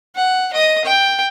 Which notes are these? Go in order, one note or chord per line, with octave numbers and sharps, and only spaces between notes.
F#5
D#5 D#6
G5